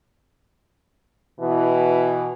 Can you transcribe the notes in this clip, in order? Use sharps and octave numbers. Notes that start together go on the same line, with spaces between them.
B2 E3